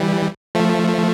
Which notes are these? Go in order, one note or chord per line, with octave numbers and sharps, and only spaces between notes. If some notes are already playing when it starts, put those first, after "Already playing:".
Already playing: E3 G3
F3 A3